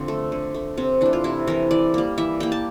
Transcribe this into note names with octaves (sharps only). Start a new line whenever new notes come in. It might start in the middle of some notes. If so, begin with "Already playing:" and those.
Already playing: D3 F3 C4
A3
D3
A3
C3 C4
E3 A3 D4
F4
C3 E4
E3 A3 A#4
E3 D5
G3 A#3
E3 E5
G3 A#3 G5
A5